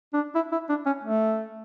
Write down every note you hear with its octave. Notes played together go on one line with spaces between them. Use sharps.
D4
E4
E4
D4
C#4
A3